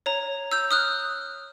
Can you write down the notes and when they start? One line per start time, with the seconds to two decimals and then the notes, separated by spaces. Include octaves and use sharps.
0.06 C#5 A#5
0.52 E6 G6
0.71 D#6 F6 F#6